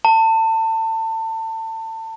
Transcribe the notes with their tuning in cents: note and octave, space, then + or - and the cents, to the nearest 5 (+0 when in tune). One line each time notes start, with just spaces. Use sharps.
A5 +30